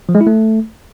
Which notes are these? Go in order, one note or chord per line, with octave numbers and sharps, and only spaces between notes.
F3
G#3
E4
A3